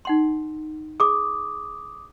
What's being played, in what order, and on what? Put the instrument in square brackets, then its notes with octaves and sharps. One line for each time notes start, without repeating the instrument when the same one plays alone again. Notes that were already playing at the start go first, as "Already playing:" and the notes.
[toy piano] D#4 F#5 C6
[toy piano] G#4 [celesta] D6 D#6